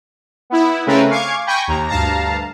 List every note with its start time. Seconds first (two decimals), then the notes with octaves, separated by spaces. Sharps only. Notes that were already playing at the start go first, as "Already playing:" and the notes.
0.50 B3 E4
0.87 C#3 A3 C4 C#4 A#4 B4
1.09 F5 G#5 C#6 D6 G#6
1.46 G5 G#5 B5 C#6 G6 A#6
1.68 D#2 A#5
1.88 D2 G2 F5 A5 A#5